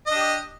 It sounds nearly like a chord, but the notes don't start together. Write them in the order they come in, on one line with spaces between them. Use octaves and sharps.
D#5 D4 G4